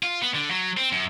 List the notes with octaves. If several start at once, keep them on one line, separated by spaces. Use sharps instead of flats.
F4
B3
D3
F#3
C4
F#2